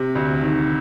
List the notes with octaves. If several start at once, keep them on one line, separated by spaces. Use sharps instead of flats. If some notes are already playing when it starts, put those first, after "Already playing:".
Already playing: C3
D2
D#3